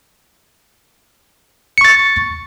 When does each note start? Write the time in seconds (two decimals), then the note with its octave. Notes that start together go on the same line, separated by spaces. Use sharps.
1.78 C#7
1.81 C#6
1.85 A6